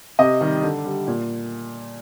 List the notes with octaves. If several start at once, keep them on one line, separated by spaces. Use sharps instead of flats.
C3 D#5
D#3 G3
D3
G3
A#2